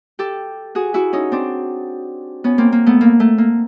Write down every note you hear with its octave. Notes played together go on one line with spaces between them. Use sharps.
G4 A4
F#4 G#4
E4 F#4
C#4 D#4
C4 D4
B3 C#4
A#3 C4
A#3
A3 B3
A#3
A3
A#3